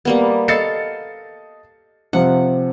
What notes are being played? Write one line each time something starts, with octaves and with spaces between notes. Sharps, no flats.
G3 A#3 B3
A4 D#5 F5 C6 A6 C#7
C3 F3 F#5